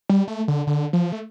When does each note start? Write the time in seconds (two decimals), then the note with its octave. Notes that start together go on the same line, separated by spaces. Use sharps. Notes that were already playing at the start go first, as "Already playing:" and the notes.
0.10 G3
0.28 A3
0.48 D3
0.67 D3
0.93 F3
1.12 A3